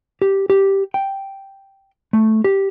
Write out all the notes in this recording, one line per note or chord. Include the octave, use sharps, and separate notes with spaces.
G4
G4
G5
A3
G4